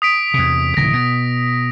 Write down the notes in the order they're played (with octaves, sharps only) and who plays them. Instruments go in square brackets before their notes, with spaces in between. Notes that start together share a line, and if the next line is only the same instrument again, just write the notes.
[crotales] D#6 B6 D7
[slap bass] E2 C3
[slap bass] D1 C#3 E3 [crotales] A#6
[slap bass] B2 [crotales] D7